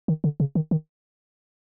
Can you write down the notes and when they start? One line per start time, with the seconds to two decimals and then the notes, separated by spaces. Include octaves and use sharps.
0.08 D#3
0.24 D3
0.40 C#3
0.55 D#3
0.71 D#3